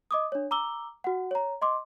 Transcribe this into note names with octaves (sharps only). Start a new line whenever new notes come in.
D#5 D6 D#6
D4 C#5
A#5 D6 E6 G7
F#4 F#5
C#5 A#5
D#5 C6 D6